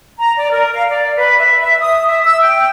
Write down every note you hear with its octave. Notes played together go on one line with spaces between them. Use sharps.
A#5
D5
A#4
F5
D5
B4
E5
E5
D#6
E5
E6
G5